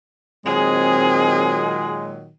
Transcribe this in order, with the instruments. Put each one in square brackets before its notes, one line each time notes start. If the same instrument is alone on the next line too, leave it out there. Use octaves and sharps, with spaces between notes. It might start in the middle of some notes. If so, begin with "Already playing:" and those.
[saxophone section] A#2 D#3 F#3 [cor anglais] G#3 [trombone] C4 [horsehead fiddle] G#4